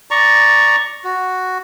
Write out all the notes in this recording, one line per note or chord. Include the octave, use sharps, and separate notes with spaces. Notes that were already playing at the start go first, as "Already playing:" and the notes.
D5 A#5 C#6
F#4